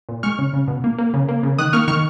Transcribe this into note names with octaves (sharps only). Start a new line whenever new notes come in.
A#2
G#3 C#6 F6
C#3
C#3
B2
A#3
A#3
C#3
A#3
C#3
D#3 D#6 F#6
A#3 C#6 F6
D#3 C#6 F6